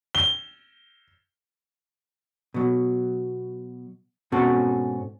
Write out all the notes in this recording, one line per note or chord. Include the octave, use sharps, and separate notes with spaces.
G7
B2 F#3
G#2 B2 C4 C#4 F#4 A4